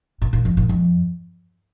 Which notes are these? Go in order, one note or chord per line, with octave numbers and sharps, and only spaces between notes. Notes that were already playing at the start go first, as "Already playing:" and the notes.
A#2
A#2
F2
A#2
F2